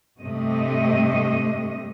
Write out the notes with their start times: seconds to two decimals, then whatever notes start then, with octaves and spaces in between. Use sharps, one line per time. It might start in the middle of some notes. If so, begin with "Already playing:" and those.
0.19 G2 C3 A3 D#5